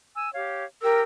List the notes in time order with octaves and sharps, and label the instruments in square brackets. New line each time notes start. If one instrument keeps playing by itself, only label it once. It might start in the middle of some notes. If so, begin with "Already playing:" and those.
[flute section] G#5 E6
G4 C#5 F5
[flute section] G4 G5 E6 [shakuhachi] A#4